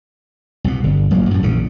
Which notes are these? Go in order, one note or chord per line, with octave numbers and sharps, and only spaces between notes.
C2 B2
G1
A1 F#3 A3 A#3
F#2 A2
A#1 C#3 E3